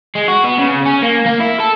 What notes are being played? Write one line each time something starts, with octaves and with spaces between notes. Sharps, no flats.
G#3
F#4
B3
C#3
C#4
A#3
A#3
E4
A4